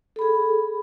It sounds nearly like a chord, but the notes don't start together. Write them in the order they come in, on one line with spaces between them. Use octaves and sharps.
A4 B5 G#4